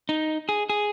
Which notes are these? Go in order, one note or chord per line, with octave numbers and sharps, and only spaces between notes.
D#4
G#4
G#4